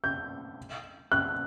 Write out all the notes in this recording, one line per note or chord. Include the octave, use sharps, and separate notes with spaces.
G6
F#6